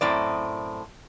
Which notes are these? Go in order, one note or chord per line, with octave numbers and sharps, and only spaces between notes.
F#2 A2 C4 D5